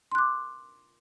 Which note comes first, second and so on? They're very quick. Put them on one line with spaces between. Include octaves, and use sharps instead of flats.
C6 F#6 D6